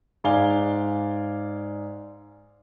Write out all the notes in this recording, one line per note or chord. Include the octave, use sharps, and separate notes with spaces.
G#2 D5 F5 G#5 G7